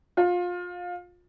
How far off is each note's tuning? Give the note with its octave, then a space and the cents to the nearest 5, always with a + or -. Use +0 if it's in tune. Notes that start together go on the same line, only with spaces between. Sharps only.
F4 +25